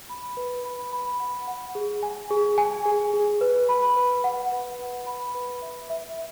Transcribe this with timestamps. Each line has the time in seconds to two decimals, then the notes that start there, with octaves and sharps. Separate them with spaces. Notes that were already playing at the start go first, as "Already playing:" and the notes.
0.09 B5
0.37 B4
0.65 B5
0.93 B5
1.20 F#5
1.47 F#5
1.75 G#4
2.03 G#5
2.31 G#4
2.58 G#5
2.86 G#4
3.13 G#4
3.41 B4
3.69 B5
3.96 B4
4.24 F#5
4.52 B4
4.79 B4
5.06 B5
5.35 B4
5.62 E5
5.90 E5